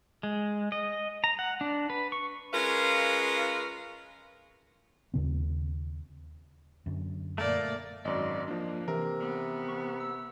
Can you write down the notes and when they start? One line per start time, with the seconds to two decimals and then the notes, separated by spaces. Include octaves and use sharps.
0.23 G#3
0.72 D#5
1.24 A#5
1.39 F#5
1.61 D4
1.90 B4
2.12 C#6
2.54 G#3 C#4 F4 A#4 B4 F5
5.14 D#2 C#3 C4
6.86 F#2 D3
7.38 A#2 A3 A#3 D5
8.05 G#1 F#2 D5 D#5
8.48 F3 A#3 D4
8.88 C3 E3 A#4
9.20 B3
9.68 C#6
10.00 E6